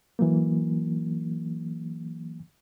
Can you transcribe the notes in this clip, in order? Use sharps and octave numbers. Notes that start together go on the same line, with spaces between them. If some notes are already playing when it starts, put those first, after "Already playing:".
E3 F#3 A#3